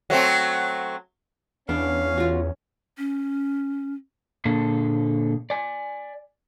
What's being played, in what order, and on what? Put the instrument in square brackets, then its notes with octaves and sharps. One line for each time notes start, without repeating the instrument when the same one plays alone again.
[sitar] F#3 A3 C4
[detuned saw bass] E2 [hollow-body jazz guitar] B3 D4 [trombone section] C#4 [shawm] F5
[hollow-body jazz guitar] F4 F#4
[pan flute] C#4
[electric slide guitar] A#2 D3 A#3 D4 G#4 A4
D5 G#5